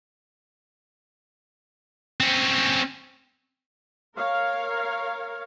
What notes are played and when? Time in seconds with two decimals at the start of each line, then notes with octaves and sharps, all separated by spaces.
2.20 C4 C#4
4.17 A#4 C#5 F5